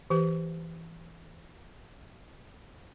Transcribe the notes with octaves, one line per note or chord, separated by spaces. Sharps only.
E3 G4 B4